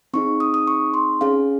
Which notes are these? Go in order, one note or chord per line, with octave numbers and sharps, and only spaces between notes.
C4 D#4 G#4 C#6
D#6
D#6
C#6
C6
C#4 G#4 F5